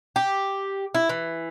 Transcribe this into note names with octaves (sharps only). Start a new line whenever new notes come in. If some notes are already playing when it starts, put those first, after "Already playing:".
G4
E4
E3